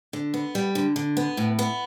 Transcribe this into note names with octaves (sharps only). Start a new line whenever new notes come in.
D3
B3
G3
D3
D3
B3
A2
B3